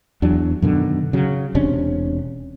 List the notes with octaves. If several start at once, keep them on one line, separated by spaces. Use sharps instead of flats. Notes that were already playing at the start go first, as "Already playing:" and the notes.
E2 F#3 D4
F#2 B2 D3 D#3
C#3 F#3
E1 C3 C#4 D4